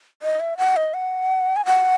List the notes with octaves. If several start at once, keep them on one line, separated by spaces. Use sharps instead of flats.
D#5
E5
F#5
D#5
F#5
G#5
F#5